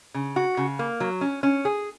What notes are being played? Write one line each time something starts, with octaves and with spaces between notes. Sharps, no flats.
C#3
F#4
C#3
A#3
F#3
C#4
C#4
G#4